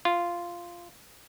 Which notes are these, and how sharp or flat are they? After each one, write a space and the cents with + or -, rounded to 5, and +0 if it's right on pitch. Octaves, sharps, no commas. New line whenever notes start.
F4 -10